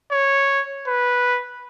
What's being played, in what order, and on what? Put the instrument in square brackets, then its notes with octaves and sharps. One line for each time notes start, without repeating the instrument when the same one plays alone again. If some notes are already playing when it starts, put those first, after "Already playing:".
[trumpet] C#5
B4